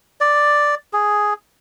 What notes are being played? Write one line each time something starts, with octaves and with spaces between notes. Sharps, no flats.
D5
G#4